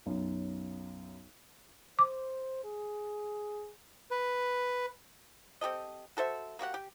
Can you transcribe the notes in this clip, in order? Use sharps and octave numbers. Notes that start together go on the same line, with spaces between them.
B1 F#2
C5 D6
G#4
B4
C4 G4 A4 D#5
F#4 A4 C5 E5
A#3 F#4 G4 F#5
G4